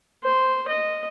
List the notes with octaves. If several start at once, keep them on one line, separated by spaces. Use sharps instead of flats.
C5
D#5